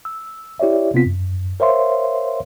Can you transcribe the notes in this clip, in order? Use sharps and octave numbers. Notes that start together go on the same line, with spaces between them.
E6
E4 G4 C#5 D5 E5
C3 B3 C4 F4 B6
F#2
A#4 C5 C#5 E5 F5 C6